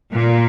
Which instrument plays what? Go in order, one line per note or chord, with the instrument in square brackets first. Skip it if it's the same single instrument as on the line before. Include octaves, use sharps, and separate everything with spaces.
[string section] A#2